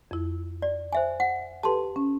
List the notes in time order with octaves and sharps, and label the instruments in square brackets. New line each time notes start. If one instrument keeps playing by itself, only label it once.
[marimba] F2 E4
[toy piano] D5
C5 E5 G#5
F#5
[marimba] G4 A4 B4 [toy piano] A5 C6
[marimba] C#4